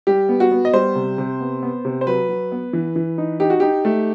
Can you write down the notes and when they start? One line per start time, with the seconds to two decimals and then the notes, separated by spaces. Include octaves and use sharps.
0.07 G3 G4
0.29 B3
0.40 F#4
0.52 B3
0.65 D#5
0.73 G3 C5
0.95 C3
1.18 C3
1.40 B3
1.63 B3
1.85 C3
2.01 C5
2.07 F#3 B4
2.29 F#3
2.52 B3
2.73 E3
2.96 E3
3.18 D#4
3.40 D#4 G4
3.50 F#4
3.60 D#4 G4
3.85 A3